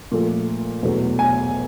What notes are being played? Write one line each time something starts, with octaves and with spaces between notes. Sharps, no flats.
A#2 F3 A3
E2 B2 F#3 A3
G#5